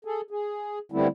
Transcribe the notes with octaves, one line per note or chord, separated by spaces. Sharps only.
G#4 A4
G#4
D3 G3 A3 B3 C4 E4